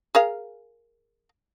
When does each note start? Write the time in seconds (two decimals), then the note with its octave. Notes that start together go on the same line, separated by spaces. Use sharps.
0.15 G#4 A#4 F5